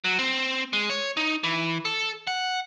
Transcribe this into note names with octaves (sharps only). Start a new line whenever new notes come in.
F#3
C4
G#3
C#5
D#4
E3
A4
F#5